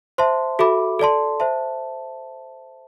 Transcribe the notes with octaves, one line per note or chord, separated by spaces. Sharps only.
C5 E5 A5 C6
F#4 A4 E5 B5 D6
A4 D5 A5 C6
C5 E5 A5